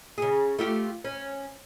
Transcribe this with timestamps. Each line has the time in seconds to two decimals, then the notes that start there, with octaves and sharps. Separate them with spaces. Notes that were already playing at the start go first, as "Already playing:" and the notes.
0.18 C#3 G#4
0.59 A3 F4 G4
1.04 C#4